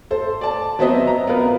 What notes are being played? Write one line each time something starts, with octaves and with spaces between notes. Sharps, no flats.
A4 C5
D5 A5
F#3 B3 C4 C5 D#5 E5
A#5
B3 C4 F4 A#4 B4